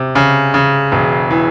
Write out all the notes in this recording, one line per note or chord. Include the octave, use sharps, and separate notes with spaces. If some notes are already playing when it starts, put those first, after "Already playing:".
Already playing: C3
C#3
C#3
E1
E3